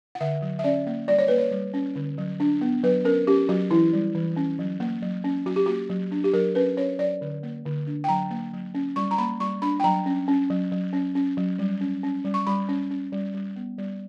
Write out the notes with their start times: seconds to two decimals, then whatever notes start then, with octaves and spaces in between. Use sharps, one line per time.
0.15 F#5
0.21 D3 E5
0.42 F#3
0.59 E5
0.64 C#4 D5
0.87 A#3
1.08 G3 D5
1.19 C#5
1.28 A#3 B4
1.38 C#5
1.51 G3
1.74 C#4
1.96 D3
2.18 F#3
2.40 D4
2.61 B3
2.84 F#3 B4
3.05 C#4 A#4
3.27 C#4 G4
3.49 F#3 F#4
3.71 E3 E4
3.93 G3
4.15 E3
4.37 C#4
4.59 F#3
4.80 A#3
5.02 F#3
5.24 C#4
5.46 F#3 F#4
5.56 G4
5.66 A#3 F#4
5.90 F#3
6.12 D4
6.24 G4
6.34 F#3 A#4
6.55 C#4 B4
6.77 C#4 C#5
6.99 F#3 D5
7.21 D3
7.43 A#3
7.65 D3
7.87 D4
8.04 G5
8.08 F#3 A#5
8.30 A#3
8.53 F#3
8.75 C#4
8.96 G3 C#6
9.11 A#5
9.18 A#3 B5
9.40 G3 C#6
9.62 D4 B5
9.80 G5
9.84 F#3 A#5
10.06 C#4
10.28 C#4
10.50 F#3
10.72 F#3
10.93 C#4
11.15 C#4
11.37 F#3
11.59 G3
11.81 C#4
12.03 C#4
12.25 G3
12.34 C#6
12.47 G3 B5
12.69 C#4
12.91 C#4
13.12 G3
13.34 G3
13.56 B3
13.78 G3